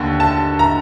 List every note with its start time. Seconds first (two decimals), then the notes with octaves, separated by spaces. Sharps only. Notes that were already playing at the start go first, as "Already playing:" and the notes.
Already playing: D#2 D3
0.20 A5
0.59 A#5